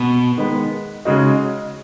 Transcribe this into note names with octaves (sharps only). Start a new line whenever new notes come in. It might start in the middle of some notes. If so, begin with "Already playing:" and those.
Already playing: B2
D#3 G#3 B3
C#3 G#3 D#4 F#4